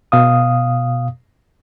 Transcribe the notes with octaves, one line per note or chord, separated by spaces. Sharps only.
B2 F5 D#6